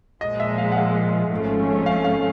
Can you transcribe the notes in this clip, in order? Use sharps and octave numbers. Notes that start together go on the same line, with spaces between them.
A#2 F3 G#3 D#5
E5
F5
F#5
F5
G#1 G#2 F3 A3 C#4
F5
F5